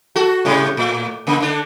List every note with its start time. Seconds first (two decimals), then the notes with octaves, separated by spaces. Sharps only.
0.16 F#4 A4
0.45 A2 C3 G3
0.77 A2
1.27 C#3 A#3
1.40 D3 D4